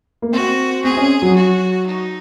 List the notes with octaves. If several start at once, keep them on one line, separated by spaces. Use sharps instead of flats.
A#3
C4 F#4
C4 G#4
C#4
F#3
F#4
D#4